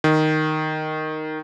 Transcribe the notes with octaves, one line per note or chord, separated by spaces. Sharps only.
D#3